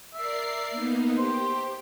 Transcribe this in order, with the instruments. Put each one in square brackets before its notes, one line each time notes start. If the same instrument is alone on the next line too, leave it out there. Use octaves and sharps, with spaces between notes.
[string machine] A#4 D5 C7 [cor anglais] E5
[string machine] A#3 B3 D#4
[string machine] G4 [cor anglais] C5